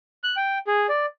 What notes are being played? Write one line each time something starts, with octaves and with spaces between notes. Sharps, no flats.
F#6
G5
G#4
D5